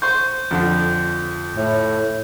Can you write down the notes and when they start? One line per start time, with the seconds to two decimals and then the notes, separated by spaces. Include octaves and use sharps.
0.02 C5 C6 C#6 G6
0.51 F2 D3 F3
1.56 A2